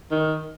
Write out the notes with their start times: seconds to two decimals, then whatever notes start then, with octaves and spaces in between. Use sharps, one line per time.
0.11 D#3